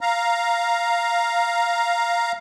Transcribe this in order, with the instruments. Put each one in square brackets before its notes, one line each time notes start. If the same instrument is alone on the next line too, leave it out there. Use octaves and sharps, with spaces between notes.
[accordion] F5 A#5